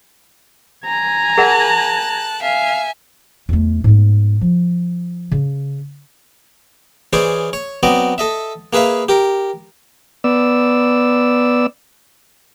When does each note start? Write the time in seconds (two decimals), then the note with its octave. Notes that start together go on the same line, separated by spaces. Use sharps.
0.86 G#5 A#5
1.38 G#4 A#4 F#5 A5 F#6
2.42 E5 F5 G#5
3.49 E2 A3
3.84 G#2 B3
4.41 F3
5.31 C#3
7.13 E3 C#4 G#4 C5 D5
7.53 C#5
7.83 F#3 B3 C4 D5 D#5
8.18 A4 D#5 E5
8.73 A#3 G#4 B4 E5 F5
9.09 G4 A#4
10.24 B3 D5 E6